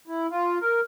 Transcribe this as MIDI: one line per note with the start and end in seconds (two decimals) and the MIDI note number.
0.07 0.27 64
0.30 0.58 65
0.61 0.81 70